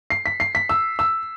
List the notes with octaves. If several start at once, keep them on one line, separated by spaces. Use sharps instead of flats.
C7
B6
C7
B6
E6
E6